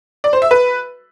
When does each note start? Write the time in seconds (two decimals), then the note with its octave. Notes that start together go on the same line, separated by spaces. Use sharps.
0.24 D5
0.33 C5
0.42 E5
0.51 B4